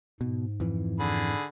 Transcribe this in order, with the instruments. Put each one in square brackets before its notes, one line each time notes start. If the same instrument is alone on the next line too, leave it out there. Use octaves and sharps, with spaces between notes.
[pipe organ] G#2 [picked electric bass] B2
[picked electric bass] F2 E3
[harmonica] D3 G#4 B5